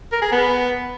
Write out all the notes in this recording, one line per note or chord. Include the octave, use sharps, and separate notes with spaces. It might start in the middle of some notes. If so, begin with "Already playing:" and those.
A#4
G#4
B3